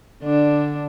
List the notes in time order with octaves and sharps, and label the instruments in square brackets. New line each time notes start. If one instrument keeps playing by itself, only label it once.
[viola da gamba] D3 D4